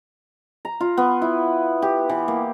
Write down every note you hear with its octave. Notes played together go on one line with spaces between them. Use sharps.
A#5
F4
B3
E4
G4
E3
A#3